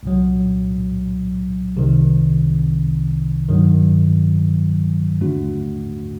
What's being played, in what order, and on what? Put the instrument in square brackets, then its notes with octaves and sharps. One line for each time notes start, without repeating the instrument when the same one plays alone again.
[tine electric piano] C2 A#2 F#3
C2 C3 D#3
G2 D#3 F#3
D#2 D3 A3 D4 F#4